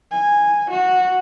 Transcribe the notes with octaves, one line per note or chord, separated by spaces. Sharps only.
G#5
F#4